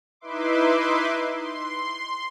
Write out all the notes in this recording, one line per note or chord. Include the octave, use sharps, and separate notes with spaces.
D#4 E4 B4 E5 C6 D6
C6